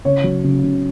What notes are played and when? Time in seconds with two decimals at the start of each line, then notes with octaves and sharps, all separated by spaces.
0.05 C#3 C#5
0.24 F#3
0.44 C#3
0.63 C#3